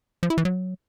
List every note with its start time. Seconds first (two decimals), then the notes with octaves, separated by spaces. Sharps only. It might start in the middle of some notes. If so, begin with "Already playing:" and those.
0.23 F3
0.30 E4
0.38 E3
0.45 F#3